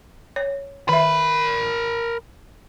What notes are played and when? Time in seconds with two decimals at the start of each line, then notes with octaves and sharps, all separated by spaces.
0.36 C#5
0.89 D#3 A#4 E5 B5